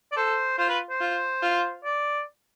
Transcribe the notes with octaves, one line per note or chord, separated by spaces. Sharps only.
D5
A4 C5
F4 C5
B4
C5
F4
F4
D5